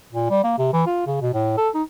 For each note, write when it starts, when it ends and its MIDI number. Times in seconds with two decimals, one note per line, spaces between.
0.13 0.30 46
0.31 0.43 55
0.44 0.57 58
0.58 0.71 48
0.73 0.84 52
0.87 1.04 65
1.07 1.22 49
1.22 1.33 47
1.34 1.55 45
1.58 1.70 69
1.75 1.83 63